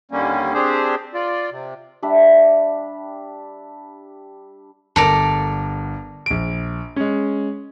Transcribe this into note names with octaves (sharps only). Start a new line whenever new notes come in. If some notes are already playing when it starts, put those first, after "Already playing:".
D#2 D3 G3 A#3 C#4
C4 D4 G4 G#4 C5
F4 D5
C3
G3 D4 E5
G1 A4 A#4 D5 D7
A#1 D7
G#3 C#4